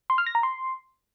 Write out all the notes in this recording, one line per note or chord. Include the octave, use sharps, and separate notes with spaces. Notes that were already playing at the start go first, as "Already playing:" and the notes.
C6
F6
A#6
A#5
C6